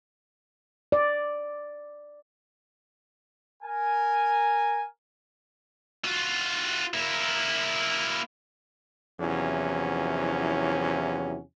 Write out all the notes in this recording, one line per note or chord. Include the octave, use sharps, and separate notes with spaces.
D5
A#4 G#5
F4 F#4
A#3 E4
E2 C3 F3 F#3 C#4 E4